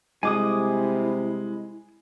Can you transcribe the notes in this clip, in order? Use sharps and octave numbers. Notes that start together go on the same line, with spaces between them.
C3 G3 G#3 E4 G#5 D6 D#6